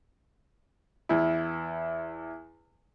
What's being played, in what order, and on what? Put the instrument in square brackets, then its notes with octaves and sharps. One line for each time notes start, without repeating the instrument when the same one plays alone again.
[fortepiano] E2 E4